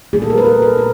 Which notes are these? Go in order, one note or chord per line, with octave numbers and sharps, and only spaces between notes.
A#2 G3 A#3 G#4
A4
A#4
B4
A#4
A4
A#2 B4